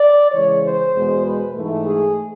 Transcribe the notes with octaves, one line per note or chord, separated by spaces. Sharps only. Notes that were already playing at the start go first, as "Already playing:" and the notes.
Already playing: D5
C#3 E3 G#3 C#5
C5
E2 B2 G#3
B4
G#2 E3 A3
G#4